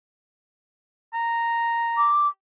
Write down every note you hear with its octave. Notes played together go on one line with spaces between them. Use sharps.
A#5
D6